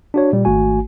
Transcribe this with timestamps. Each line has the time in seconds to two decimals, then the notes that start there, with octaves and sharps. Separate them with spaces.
0.14 D4 F#4 C#5
0.33 A#2 G3
0.45 G#1 A3 F#4 G#5